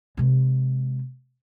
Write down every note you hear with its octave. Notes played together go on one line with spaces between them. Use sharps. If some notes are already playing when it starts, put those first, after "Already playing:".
C3 G#3